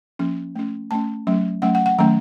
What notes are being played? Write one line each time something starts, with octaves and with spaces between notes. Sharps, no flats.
F3 A#3 C#4
A3 C#4
A3 C#4 A5
F#3 A3 C#4
F#3 A3 C#4 F#5
F#5
F#5
D#3 F#3 A3 C#4 A#5